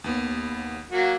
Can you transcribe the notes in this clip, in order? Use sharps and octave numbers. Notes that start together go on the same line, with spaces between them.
D#2 B3
F#3 A#3 F#4